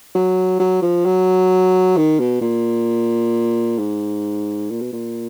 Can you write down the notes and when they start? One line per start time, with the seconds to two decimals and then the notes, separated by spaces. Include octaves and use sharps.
0.15 F#3
0.60 F#3
0.82 F3
1.05 F#3
1.97 D#3
2.20 B2
2.41 A#2
3.79 G#2
4.70 A#2
4.81 B2
4.93 A#2